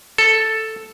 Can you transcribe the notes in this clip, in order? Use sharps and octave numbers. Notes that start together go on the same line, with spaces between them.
A4